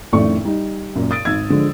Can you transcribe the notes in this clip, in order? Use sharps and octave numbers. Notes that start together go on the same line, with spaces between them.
A1 F2 D#3 A3 D5 C#6
G3 D#4
F#2 A#2
D#6 A6 D7
G#1 E6 G#6
D3 F3 G#3